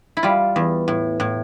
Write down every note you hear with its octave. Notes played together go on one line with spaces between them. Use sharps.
E4
G3 F4
E2
A2
A2